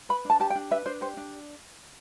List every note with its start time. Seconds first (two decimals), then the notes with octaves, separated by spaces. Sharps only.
0.09 B4 B5
0.25 D4 A5
0.40 G4 A5
0.50 G5
0.55 D4
0.71 B4 E5
0.86 D4 C5
1.01 G4 C5
1.17 D4